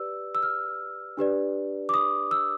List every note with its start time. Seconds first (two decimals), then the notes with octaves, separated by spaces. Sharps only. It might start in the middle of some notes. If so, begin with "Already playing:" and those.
Already playing: G4 B4 D5 E6
0.35 E6
0.43 F6
1.17 D4 G4 B4 D5
1.89 D6
1.94 D#6
2.31 E6